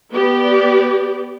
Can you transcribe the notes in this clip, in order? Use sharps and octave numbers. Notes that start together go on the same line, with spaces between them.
B3 G4 D5